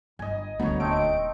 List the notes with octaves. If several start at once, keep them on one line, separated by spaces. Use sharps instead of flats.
G1 D#5 G#5
D2 D#3 G3 B3 C#5 A#5
D#1 A3 C4 D#4 D7